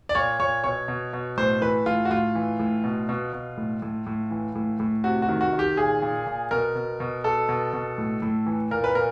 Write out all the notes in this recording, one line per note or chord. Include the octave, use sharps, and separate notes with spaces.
D5
A#2 C#5
A#2 C#5
B2 C#5
B2
B2
A2 C5
E3 B4
A2 F4
F#4
A2 F4
E3
A2
B2
B2
B2
A2
A2
A2
E3
A2
A2
C3 F#4
F#4
D#3
F#4
D#3
G4
A#2 G#4
A#2
A#2
B2 A#4
B2
B2
B2 A4
B2
B2
A2
A2
E3
A#2 A#4
B4
A#2 A#4